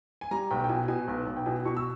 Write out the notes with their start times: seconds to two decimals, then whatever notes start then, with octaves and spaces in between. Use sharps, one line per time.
0.21 G#5
0.31 G3 A#5
0.51 B1 G5
0.64 G5
0.69 B2 G#5
0.88 B2 G#5
1.08 B1
1.27 B1
1.37 G5
1.46 B2 G#5
1.65 B2 C#6
1.77 E6